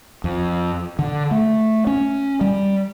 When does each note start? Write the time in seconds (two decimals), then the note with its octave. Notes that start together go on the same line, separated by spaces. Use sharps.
0.24 F2
0.99 D3
1.31 A3
1.87 C#4
2.41 G3